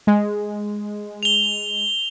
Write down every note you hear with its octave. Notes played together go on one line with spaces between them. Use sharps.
G#3
F7 G7